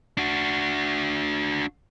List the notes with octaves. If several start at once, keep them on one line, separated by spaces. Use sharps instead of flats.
D4 F#4